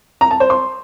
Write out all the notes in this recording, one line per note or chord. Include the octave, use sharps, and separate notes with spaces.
A#5
A5
C5
C6